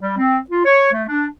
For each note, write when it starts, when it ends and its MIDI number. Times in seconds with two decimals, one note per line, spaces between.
0.01 0.15 55
0.17 0.38 60
0.50 0.65 65
0.65 0.91 73
0.92 1.03 57
1.08 1.26 62